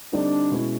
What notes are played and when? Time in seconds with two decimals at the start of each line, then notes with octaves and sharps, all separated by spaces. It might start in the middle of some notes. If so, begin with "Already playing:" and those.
0.13 D3 G3 C4 D4 D#4
0.52 B2 G#3 C#4 E4